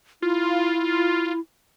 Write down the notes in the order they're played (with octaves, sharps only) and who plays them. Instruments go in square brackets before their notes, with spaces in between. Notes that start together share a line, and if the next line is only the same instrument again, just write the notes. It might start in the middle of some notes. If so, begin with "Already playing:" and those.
[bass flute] E4 [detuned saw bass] F4